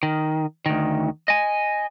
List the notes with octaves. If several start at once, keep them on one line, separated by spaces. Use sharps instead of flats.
D#3
D2 D#3
D#5 G#5